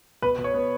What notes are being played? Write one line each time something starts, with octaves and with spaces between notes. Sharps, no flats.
B2 B4
B2
C#5
B3